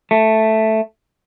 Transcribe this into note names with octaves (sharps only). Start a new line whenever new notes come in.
A3